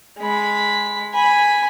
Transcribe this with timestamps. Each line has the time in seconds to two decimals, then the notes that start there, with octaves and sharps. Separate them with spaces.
0.19 G#3 B5
1.14 G#5 B5